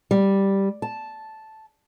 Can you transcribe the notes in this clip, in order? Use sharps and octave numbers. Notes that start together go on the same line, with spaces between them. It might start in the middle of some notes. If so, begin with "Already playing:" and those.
G3
A5